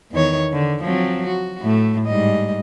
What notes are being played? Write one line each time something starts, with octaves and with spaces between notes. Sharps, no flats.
E2 D#3 C#5
D3
F3 F#3 C4
F#4
A2 A3
G#2 G3 D#5